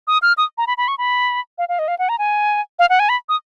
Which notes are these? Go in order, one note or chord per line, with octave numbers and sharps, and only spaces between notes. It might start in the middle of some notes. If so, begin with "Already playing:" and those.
D#6
F6
D#6
A#5
B5
B5
C#6
B5
F5
F5
D#5
F5
F#5
A#5
G#5
F5
F#5
G#5
B5
D#6